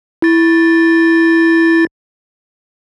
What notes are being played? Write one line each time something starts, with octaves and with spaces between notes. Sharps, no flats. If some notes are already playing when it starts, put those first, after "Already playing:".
E4 A6